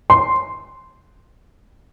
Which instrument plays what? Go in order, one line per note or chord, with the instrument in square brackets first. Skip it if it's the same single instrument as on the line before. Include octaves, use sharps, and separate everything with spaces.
[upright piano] C6